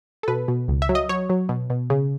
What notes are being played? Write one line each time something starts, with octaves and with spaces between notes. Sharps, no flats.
A4
B2 B4
B2
C#2
E5
F#3
D#5
F#3 C#5
F#3
B2
B2
C#3